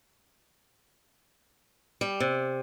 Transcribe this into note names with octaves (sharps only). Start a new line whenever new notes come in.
G3
C3